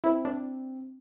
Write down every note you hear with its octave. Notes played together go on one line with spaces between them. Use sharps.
C4 E4
C4 D4